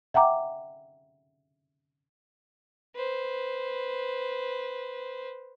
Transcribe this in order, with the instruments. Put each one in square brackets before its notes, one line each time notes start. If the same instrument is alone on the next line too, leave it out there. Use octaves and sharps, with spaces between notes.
[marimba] E5 F#5 G5 A#5 D6
[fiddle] B4 C5